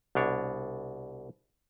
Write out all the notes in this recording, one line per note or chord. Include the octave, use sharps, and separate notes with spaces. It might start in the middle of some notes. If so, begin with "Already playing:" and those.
C2 B2 D4 C#5